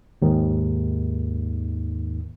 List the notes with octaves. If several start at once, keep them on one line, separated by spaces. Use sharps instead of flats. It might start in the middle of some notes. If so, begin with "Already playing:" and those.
D#2 G#2 D#3